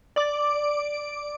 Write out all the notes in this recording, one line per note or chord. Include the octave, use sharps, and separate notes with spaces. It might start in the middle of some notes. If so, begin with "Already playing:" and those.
D5 D6